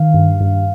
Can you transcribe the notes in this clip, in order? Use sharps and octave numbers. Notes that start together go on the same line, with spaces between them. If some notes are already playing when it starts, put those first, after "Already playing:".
Already playing: D#3 F5
G2
G2